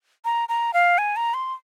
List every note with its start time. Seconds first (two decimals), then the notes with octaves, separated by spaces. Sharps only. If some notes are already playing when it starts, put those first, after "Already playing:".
0.25 A#5
0.49 A#5
0.74 F5
0.98 G#5
1.16 A#5
1.34 C6